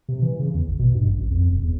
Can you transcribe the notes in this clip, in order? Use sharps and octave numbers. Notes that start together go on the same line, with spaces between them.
C3
E3
C#3
E2
G#1
B2
G2
A1
A1
F2
E1
E2